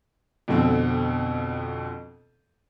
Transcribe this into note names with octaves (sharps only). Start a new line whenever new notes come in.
F2 B2 D3 C4